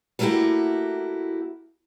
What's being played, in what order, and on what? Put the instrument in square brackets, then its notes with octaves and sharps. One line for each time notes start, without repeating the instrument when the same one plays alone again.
[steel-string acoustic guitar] G3 A3 A#3 E4 F#4 G4